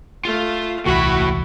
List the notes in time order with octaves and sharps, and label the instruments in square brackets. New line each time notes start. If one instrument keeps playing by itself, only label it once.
[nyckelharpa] A3 F5 [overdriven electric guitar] F4
[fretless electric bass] D#1 C2 E3 [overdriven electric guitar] A2 B5 [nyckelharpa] E4 [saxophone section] F#4